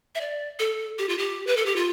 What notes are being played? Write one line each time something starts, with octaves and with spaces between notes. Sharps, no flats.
E5
D5
A4
G4
F4
G4
B4
A4
G4
F4